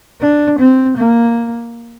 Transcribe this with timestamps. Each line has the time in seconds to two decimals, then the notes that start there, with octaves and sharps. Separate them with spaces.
0.21 D4
0.59 C4
0.97 A#3